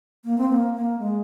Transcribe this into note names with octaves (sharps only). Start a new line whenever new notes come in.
A#3
C4
A#3
A#3
G#3